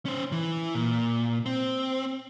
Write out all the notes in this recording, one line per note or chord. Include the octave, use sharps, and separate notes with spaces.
C#4 C5
E3
A#2
C4